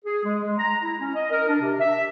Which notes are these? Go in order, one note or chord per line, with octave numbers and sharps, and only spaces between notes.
G#4
G#3
G#3
A#5
E4
C#4
D#5
A#4
D4
C3
E5